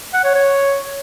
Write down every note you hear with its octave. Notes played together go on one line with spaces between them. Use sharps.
F#5
C#5
C#5